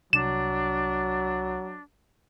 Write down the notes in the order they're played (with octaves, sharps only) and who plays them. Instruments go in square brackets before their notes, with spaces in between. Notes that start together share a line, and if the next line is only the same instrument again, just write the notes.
[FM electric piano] C2 [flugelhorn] F#3 [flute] D4 [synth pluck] E7